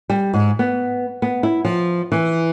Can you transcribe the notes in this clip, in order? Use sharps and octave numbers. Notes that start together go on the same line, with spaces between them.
G3
G#2
B3
B3
E4
F3
E3